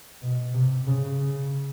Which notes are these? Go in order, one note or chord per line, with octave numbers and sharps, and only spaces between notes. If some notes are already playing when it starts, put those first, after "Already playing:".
B2
C3
C#3
C#3